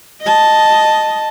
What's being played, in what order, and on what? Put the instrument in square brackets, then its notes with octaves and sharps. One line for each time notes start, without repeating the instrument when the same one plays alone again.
[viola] D#5 A5